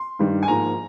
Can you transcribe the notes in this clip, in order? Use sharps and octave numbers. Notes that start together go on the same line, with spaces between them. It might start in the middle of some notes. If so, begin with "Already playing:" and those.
Already playing: C6
G2 D#3 G3
G#5
G#2 F3 A#3 A#5